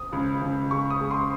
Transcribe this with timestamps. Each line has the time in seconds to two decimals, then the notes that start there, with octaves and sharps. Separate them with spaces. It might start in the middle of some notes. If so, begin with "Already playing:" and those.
Already playing: D#6
0.12 C#2
0.41 C#2
0.71 G#3 C#6
0.90 D#6
1.01 G#3
1.11 C6